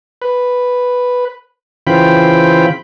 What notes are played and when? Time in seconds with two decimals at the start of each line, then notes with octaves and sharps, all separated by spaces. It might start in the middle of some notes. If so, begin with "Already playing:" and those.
0.22 B4
1.87 C#3 E3 C4 F4 G5 B5